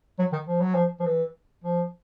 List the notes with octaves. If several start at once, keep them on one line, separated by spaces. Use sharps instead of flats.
F#3
D#3
F3
F#3
F3
F3
E3
F3